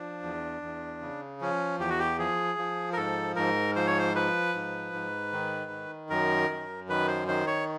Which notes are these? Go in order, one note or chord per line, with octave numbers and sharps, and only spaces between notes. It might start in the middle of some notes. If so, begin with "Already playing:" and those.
Already playing: F3 D4
E2
E2
C#3
F3 C#4
E2 G4
F#4
G4
F3 G#4
F3
A#4
G#2 A4
G#2 A#4
F3 C5
C#5
C5
F3 B4
G#2
G#2
D#3
D#3
F#2 A#4
F#2
D#3 B4
C5
D#3 C5
C#5